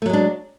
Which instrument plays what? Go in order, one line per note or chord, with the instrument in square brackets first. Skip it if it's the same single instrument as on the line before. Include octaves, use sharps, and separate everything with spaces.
[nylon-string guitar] A3
F#3
G#3
D4